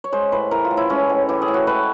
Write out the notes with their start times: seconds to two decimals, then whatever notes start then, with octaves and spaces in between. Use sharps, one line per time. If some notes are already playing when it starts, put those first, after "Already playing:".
0.04 C#5
0.12 G#3 C5
0.32 A2 B4
0.51 E3 A#4
0.65 F4
0.71 A2
0.77 E4
0.89 G#3 C#4
1.10 A2
1.29 E3 G4
1.42 G#4
1.48 A2
1.54 F#4
1.67 G#3 B4